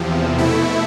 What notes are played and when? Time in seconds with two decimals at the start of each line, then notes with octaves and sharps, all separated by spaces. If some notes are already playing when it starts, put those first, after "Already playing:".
Already playing: E2 C3 F3
0.38 B2 A3 E4